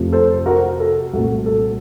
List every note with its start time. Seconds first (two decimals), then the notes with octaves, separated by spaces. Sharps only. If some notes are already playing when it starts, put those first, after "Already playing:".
Already playing: F2 C3 F3 A3
0.12 A4 C5
0.46 F#4 A#4
0.80 A4
1.13 C2 A#2 A3 C4 F#4
1.46 A4